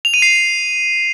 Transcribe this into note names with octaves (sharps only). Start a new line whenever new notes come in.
F7
D#7
C7